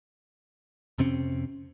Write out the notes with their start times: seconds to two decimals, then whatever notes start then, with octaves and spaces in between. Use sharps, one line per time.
0.98 F2 C3 C4 C#4